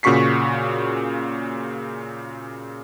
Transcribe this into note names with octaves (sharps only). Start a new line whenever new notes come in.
A#2 C#3 F#4 C#6 B6 C7